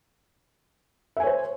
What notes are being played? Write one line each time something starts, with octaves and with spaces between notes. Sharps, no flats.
C5 C#5 E5 G#5